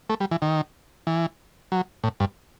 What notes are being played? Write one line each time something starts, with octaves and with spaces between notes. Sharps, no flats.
A3
G3
E3
D#3
E3
F#3
A2
G2